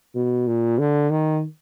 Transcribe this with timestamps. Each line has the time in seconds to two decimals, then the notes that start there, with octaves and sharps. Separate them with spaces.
0.15 B2
0.47 A#2
0.79 D3
1.11 D#3